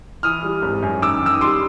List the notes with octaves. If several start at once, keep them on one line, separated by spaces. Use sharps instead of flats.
E3 D#6 F6
G3
G#1
F#2
D#3 D6 E6
D#3 E6
D#6
G3 C6 D6